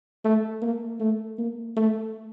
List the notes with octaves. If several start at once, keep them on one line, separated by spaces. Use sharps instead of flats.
A3
A#3
A3
A#3
A3